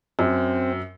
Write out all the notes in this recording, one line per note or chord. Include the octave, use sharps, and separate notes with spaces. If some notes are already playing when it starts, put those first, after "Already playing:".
F#2 C4